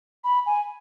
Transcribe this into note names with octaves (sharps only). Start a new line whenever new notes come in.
B5
G#5